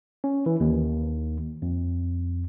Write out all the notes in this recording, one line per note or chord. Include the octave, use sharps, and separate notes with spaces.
C#4
E3
D#2
F2